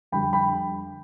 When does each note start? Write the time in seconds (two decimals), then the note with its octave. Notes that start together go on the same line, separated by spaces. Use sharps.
0.12 F2 D3 G3 G5 B5
0.33 G5 B5